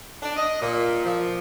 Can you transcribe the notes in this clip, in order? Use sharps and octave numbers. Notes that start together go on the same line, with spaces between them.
D4
D#5
A#2
F3